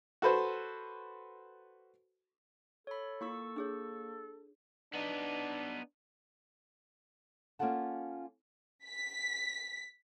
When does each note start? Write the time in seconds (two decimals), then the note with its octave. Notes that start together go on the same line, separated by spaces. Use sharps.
0.22 F#4 A4 B4 C5
2.87 A4 C#5 B5
3.21 A#3 E4 F4 C#6 E6
3.56 D4 G#4 C#5
4.94 B3 D4 D#4
7.59 A#3 C#4 F4 A4 F#5 A5
8.87 B6